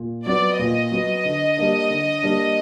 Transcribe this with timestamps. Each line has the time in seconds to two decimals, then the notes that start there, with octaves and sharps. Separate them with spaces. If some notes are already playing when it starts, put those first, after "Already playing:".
Already playing: A#2
0.26 F#3 B3 D5
0.59 A#2 D#5
0.91 F#3 B3
1.25 D3
1.57 G3 A#3 D4
1.90 D3
2.22 G3 A#3 D4